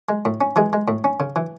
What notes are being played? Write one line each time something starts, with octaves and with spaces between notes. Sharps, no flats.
G#3
A2
C#4
E3 G#3 G#4
G#3
A2
C#4
C#3
E3